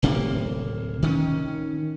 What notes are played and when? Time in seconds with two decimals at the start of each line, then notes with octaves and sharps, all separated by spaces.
0.03 D1 C3 A#3
1.02 D#3 C4 C#4